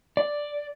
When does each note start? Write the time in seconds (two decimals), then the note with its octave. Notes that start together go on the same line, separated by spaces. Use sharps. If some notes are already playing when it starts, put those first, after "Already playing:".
0.17 D5